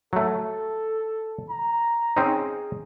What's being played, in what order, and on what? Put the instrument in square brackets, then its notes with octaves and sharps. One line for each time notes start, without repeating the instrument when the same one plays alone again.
[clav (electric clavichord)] F#3 A3 [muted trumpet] A4
[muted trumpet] A#5
[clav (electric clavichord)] C4 C#4 D#4 [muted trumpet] G#4